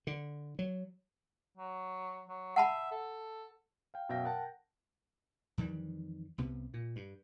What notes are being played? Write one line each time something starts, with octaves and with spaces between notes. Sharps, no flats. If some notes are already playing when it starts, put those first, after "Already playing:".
D3
F#3
F#3
F#3
E5 F#5 A5 B5
A4
F5 G5
F#2 B2 E5 F5 G5 A#6
A#4 F#5 G5 A5
F2 D#3 E3 G3
C2 C3 B3
A#2
G2